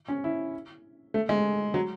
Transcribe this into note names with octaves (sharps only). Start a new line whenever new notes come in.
C#4
E4
A3
G#3
F#3